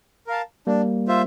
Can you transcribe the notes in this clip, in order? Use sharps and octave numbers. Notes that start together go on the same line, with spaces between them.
A#4 F5 A5
G3 A#3 D4
F4 C5 E5